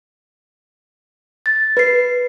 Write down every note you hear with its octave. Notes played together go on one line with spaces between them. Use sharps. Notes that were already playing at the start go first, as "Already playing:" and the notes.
A6
B4 C7